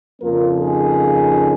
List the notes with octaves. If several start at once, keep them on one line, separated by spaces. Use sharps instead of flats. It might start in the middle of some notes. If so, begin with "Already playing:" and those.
F2 C#3 F3 A#3 C#4 F4 A#4
D#4 G#4